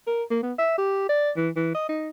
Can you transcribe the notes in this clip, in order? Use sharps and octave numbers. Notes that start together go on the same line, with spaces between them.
A#4
A#3
B3
E5
G4
D5
E3
E3
D#5
D#4